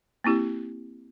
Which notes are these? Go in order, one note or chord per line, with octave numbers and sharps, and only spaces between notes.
A#3 C4 E4 G4